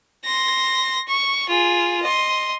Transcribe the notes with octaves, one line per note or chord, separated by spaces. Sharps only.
C6 A#6
C#6
F4 G#4
D#5 C6